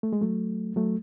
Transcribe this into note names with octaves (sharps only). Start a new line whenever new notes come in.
A3
G#3
F#3 A3
F#3 A3